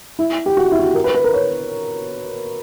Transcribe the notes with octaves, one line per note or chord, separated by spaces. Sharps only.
E4
G4
F#4
E4
F#4
G4
A#4
B4
B4
A#4
C#5